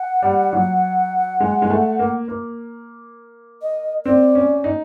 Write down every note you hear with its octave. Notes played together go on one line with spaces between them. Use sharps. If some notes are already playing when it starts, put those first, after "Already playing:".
Already playing: F#5
G3
F#3
G#3
G#3
A3
A#3
A#3
D#5
C4 D5
C#4
D#4